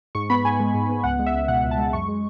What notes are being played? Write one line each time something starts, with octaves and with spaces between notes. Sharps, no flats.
G#2 C#6
B3 B5
G#2 G#5
G#3
G#2
B3
C#2 F#5
G#3
E5
C#2
B2 F#5
C#2
A5
G#3
F#2 C#6
G#3